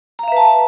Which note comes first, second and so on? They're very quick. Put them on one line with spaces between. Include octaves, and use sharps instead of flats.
A#5 F5 E5 B4 A5